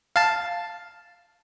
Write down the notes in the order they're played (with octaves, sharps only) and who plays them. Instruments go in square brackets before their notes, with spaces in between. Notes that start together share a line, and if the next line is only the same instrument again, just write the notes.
[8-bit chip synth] F5 A5